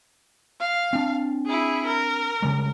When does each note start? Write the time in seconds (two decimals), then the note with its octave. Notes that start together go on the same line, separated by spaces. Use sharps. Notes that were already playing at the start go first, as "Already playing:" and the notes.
0.60 F5
0.93 C4 D4
1.46 E4 G#4
1.86 A#4
2.42 C#3 G3 G#3